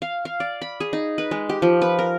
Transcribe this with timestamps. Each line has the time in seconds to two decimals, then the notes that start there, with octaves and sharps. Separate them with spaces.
0.02 F5
0.25 F5
0.40 D5
0.62 B5
0.80 G#4
0.93 D#4
1.18 B4
1.31 G#3
1.49 G4
1.62 F3
1.82 B4
1.99 A#4